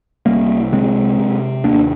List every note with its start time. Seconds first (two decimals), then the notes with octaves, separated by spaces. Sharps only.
0.26 C2 G3 A#3
0.73 C3 G#3 C4
1.19 C3
1.64 D#2 A#3 D4